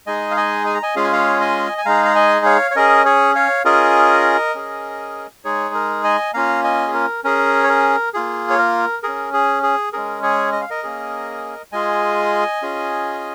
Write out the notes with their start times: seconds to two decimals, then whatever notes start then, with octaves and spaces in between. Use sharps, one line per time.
0.07 G#3 D#4 G#4 D#5 G#5
0.31 F5
0.37 D#5 G#5
0.66 G#5
0.74 A#5
0.83 D#5 G#5
0.96 G#3 C#4 F4 G#4 F5
1.04 G#5
1.12 C#5 F5
1.41 D#5 G#5
1.78 G#5
1.86 G#3 D#4 G#4 F5 A#5
2.05 A#5
2.15 D#5 G#5
2.46 C#5 F5
2.71 C#5
2.76 C#4 G#4 A#4 D#5
3.05 G#4 C#5
3.35 C#5 F5
3.65 C#4 F4 G#4 A#4 D#5
4.55 C#4 G#4
5.45 G#3 D#4 G#4 C#5
5.75 A#4
6.04 D#5 G#5
6.34 A#3 C#4 F4 F5 A#5
6.64 D#5 G#5
6.87 G#4
6.94 A#4
7.24 C#4 G#4 A#4
7.64 C#5
7.69 A#4
8.14 A#3 F4 G#4
8.50 C#5
8.58 A#4
9.03 C#4 G#4 A#4
9.33 G#4
9.63 G#4
9.93 G#3 C#4 G#4 A#4
10.23 G#4 C#5
10.52 D#5
10.61 F5
10.70 A#4 D#5
10.83 A#3 C#4 G#4
11.72 G#3 F4 G#4 D#5 G#5
12.62 C#4 F4 G#4